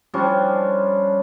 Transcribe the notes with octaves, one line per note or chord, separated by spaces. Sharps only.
F3 G3 C#4 D4